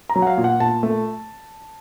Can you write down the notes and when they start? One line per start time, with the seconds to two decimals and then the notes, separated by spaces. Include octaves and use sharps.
0.09 A#5
0.16 F#3
0.22 F#5
0.27 F5
0.37 A#2
0.44 F#5
0.60 A#2 A5
0.83 A3